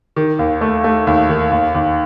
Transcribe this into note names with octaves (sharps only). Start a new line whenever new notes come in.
D#3
D#2
A3
A3
D#2
D#3
D#2
D#2